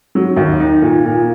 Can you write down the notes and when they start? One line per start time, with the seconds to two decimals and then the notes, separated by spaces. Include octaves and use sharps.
0.15 F#3
0.37 D#2
0.60 D#4
0.82 A#2
1.06 A#2